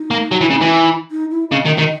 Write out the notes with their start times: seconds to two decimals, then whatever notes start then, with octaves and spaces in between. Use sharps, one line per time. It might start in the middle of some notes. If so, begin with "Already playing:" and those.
Already playing: D#4
0.11 A#3
0.32 F#3
0.41 E3
0.50 C#3
0.61 E3
1.11 D#4
1.31 E4
1.51 C#3 D#5
1.65 D#3
1.78 D#3